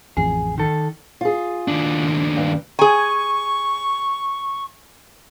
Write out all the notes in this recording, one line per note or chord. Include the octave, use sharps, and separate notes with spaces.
A1 F2 E3 G#4
D#3 A4
F4 G#4
D#2 D4
G2
G#4 G#5 C#6